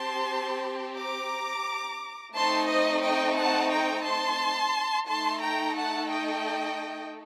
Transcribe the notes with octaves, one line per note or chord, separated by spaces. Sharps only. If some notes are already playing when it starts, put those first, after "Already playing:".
Already playing: C4 G4 A5 C6
A#5 D6
A3 C4 D#4 A5 C6
C5 D#5
D#5 G5
F#5 A5
G5 A#5
A5 C6
A3 D#4 A4 A5 C6
G5 A#5
F#5 A5
D#5 G5